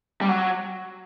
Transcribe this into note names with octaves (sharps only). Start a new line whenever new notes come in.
G3
F#3